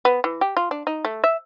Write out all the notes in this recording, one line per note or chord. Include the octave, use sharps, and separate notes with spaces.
B3
E3
G4
F4
D4
D#4
A3
E5